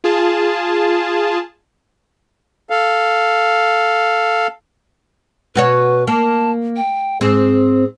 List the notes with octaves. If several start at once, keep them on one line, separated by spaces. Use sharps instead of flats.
F4 G#4 A5
A4 F5
B2 F#4 B4 C#5
A#3 A5
G5
G#2 C4 G#4